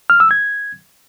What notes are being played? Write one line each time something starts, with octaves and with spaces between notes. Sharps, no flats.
F6
E6
G#6